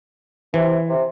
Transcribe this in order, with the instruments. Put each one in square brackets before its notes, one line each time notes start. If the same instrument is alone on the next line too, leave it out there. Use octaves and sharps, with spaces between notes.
[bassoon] C3 [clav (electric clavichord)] E3
[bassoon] C3